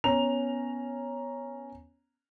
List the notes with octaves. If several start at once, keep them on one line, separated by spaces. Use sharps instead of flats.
B3 C#4 A#5 F7